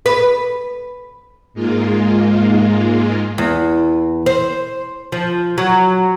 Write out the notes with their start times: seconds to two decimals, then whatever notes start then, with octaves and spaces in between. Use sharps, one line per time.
0.06 B4
1.54 G#2 G#3 A#3 F4
3.38 E2
4.26 C5
5.12 F3
5.58 F#3